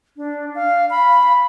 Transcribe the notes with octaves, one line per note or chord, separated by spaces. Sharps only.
D4
F5
B5